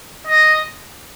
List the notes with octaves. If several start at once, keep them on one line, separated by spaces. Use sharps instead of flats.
D#5